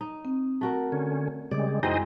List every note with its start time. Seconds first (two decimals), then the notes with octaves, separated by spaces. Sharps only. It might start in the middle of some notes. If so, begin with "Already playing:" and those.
0.01 D#4
0.25 C4
0.61 A3 F#4 A#4
0.92 D3 C#4
1.51 C#3 G3 G#3 D5
1.83 F#2 E3 G#3 C4 D#4 C5 D#5